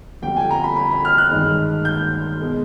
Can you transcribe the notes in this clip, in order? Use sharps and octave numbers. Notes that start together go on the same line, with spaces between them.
F2 D3 G3 G5
G#5
A#5
B5
B5
B5
F6
F#6
G2 D#3 G#3
G6
B2 G#3